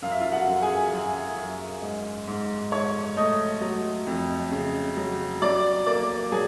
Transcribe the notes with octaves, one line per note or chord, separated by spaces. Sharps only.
F#2 F5
E5
F4 F5
F#4 F#5
F#2
G#4 G#5
F#2
F#2
G#2
G#2
G#2 C#5 C#6
A3 D#5 D#6
F#3
F2
C#3
F#3
F#3 D5 D6
A#3 D5 D6
F#3 G#4 G#5